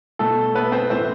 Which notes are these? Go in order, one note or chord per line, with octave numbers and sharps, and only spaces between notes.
B2 A3 A4
B3 B4
C4 C5
A2 E3 C4 C5